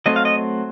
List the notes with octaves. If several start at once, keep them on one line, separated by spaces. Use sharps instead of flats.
F#3 A3 C4 D#5
F5
D#5